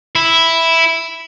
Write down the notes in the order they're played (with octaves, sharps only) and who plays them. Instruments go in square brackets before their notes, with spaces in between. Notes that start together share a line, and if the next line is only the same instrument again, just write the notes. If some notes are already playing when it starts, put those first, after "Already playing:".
[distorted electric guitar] E4